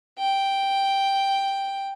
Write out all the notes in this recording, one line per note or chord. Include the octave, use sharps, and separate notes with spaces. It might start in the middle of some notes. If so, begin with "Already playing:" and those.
G5